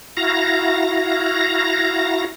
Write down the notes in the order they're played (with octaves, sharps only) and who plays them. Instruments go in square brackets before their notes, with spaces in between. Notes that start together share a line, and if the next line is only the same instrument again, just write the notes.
[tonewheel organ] E4 F#4 F5 A#5 A#6